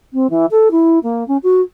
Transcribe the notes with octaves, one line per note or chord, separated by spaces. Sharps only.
C4
E3
A4
E4
A#3
C#4
F#4